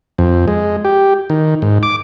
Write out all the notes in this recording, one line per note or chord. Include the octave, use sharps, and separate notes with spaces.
F2
G#3
G4
D#3
G#2
D6